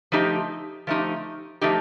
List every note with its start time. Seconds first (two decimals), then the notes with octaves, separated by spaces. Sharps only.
0.12 F3 A3 D#4 G4
0.87 F3 A3 D#4 G4
1.61 F3 A3 D#4 G4